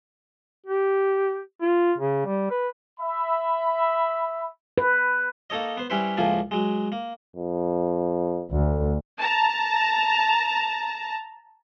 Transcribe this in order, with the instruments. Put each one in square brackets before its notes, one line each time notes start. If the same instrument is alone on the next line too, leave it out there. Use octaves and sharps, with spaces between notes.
[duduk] G4
F4
C#3
G3
B4
[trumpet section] E5 B5
[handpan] B4
[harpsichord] A#3 D#4 A4 C#5 D#5
B3 C5
G3 C#4 E4 B4 C5
C#2 A2 F3 A#3 F4 G#5
F#3 G#3
A#3
[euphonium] F2
[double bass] D2 [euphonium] A3
[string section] A5 A#5